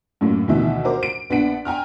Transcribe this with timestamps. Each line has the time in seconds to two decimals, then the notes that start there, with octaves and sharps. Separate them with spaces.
0.21 F#2 A2 A#3
0.48 D2 B2 D#3 E3 E5
0.84 F#4 A#4 C5 D6
1.03 D7
1.30 A#1 B3 D4 F#5 B6 D7
1.65 G5 G#5 A#5 F6